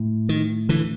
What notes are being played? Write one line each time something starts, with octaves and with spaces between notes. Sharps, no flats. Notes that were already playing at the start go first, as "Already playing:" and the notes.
Already playing: A2
D#3
D3 E3